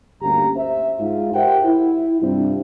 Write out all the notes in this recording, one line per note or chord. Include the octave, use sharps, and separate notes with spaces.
G1 D2 A#3 C#4 G4 A#5
C5 E5
G#2 F4
G4 A#4 C5 E5 F#5 G5
E4
G2 C3 G3 C4 D4 F4